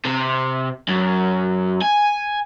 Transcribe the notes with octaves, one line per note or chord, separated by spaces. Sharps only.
C3
F#2
G#5